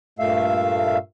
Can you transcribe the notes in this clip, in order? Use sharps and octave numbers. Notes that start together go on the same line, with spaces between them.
G2 A#2 A3 E5 F5